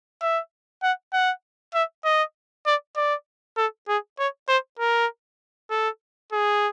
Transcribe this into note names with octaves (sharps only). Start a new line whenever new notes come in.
E5
F#5
F#5
E5
D#5
D5
D5
A4
G#4
C#5
C5
A#4
A4
G#4